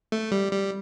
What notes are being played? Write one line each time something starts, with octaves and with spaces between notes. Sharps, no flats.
A3
G3
G3